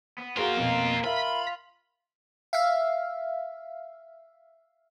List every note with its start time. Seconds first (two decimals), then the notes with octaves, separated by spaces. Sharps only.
0.18 B3
0.37 A#3 C4 F4 F#4 G#4 A#4
0.57 F2 B2
1.04 F4 A#4 E5 B5
2.53 E5 F5